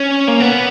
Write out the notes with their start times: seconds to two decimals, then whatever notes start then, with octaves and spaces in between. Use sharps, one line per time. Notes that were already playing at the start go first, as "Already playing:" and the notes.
Already playing: C#4
0.28 A#3
0.40 B3